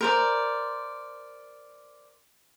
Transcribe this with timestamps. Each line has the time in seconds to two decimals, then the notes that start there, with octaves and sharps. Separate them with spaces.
0.01 A#4 C5 D5